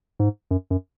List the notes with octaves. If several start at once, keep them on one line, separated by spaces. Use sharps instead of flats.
G#2
F#2
F#2